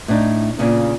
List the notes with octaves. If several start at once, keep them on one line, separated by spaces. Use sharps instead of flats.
A2 D4 D#4
A#2 C#3 B3